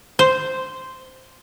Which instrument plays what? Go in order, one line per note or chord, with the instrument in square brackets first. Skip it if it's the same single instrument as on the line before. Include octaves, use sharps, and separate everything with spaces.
[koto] C5